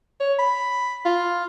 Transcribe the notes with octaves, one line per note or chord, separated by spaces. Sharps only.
C#5
B5
F4